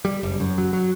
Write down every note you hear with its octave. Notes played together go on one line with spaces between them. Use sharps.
G3
F#1
F#2
F#3
F#3